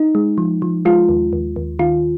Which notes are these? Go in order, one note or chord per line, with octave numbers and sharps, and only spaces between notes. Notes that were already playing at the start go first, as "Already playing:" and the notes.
Already playing: D#4
G#3
F3
F3
G#3 F4
D#2
D#2
D#2
D#3 F4